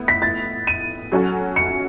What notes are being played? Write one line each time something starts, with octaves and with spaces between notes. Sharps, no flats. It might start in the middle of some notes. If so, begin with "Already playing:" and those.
Already playing: A2 B3 E4
B6
A6
D#7
F#3 C#4 F#4 A4
C#7